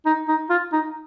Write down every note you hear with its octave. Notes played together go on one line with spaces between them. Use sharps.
D#4
D#4
F4
D#4